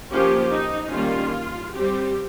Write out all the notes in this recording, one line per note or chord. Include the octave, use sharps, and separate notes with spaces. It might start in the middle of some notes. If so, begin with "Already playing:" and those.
F3 A#3 C#4 G4
D#4
D#3 G3 A#3 C#4 F4
G3 C4 G4